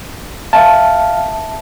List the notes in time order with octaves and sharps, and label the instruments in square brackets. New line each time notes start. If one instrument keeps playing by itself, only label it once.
[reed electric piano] E5 A5 [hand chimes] F5